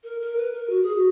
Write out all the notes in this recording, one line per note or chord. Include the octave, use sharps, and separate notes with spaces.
A#4
A#4
B4
A#4
F#4
G#4
F#4